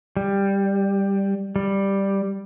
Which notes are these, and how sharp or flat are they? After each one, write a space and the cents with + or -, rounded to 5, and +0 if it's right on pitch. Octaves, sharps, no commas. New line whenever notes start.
G3 +10
G3 +5